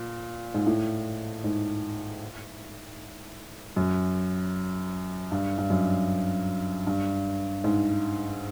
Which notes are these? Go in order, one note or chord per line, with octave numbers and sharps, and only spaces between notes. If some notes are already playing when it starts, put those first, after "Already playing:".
Already playing: A#2
G#2
A2
G#2
F#2
G2
G2
F#2
G2
G#2